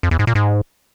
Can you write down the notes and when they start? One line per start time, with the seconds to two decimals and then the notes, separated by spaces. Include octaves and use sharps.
0.03 F2
0.11 E2
0.19 G#2
0.27 A#2
0.35 G#2